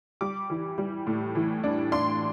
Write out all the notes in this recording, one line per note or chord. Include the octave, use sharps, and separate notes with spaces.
G3 D6
E3
G3
A2
E3
D4
D4 C6